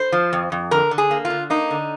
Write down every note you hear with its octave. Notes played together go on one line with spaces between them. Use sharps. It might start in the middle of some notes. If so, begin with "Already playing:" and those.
Already playing: C5
F3
F2
F2
D3 A#4
D3
G#4
A#3
F4
D3
A#3 D#4
D3